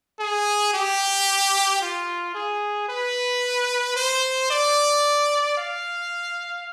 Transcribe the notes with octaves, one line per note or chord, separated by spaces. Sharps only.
G#4
G4
F4
G#4
B4
C5
D5
F5